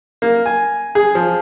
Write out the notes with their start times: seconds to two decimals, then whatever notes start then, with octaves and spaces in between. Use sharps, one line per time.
0.22 A#3
0.46 G#5
0.95 G#4
1.15 F3